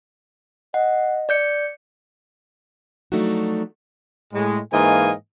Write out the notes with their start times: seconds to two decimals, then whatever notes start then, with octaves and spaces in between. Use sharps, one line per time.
0.74 D#5 F#5
1.29 D5 G6 C#7
3.12 F3 F#3 A3 D4 D#4 F#4
4.33 A2 G#3
4.72 G#2 E3 A#3 D#5 F5 G#5